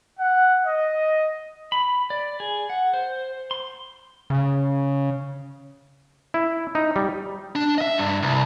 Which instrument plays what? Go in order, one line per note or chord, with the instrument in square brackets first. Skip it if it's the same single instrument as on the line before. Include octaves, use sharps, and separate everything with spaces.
[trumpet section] F#5
D#5
[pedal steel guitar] B5
D5
G#4
F#5
C5
C6
[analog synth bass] C#3
[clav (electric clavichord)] E4
D#4
G3
[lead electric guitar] D4
D#5 E5
G2
C2